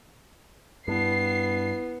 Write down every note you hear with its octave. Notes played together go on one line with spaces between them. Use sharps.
G2 B3 E4 C7